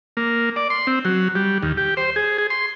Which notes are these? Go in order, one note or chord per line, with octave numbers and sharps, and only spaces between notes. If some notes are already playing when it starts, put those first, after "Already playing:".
A#3
D5
C6
C4
F#3
G3
D#2
G4
C5
G#4
G#4
C6